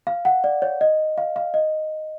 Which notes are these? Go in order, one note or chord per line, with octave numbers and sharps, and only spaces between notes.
F5
F#5
D5
C#5
D#5
F5
F5
D#5